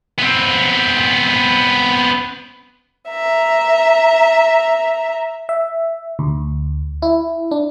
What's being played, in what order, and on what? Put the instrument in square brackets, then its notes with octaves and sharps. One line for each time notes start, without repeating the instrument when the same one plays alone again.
[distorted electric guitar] B3 C4
[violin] E5 A#5
[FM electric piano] E5
D2
E4
D4